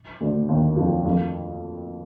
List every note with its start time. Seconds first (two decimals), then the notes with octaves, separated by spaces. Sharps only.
0.21 D2 D3
0.49 D#2 D#3
0.77 F2 F3
1.04 F2 F3